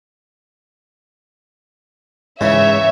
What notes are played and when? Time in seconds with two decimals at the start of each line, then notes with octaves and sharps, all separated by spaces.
2.41 G#2 C#3 E3 C#5 E5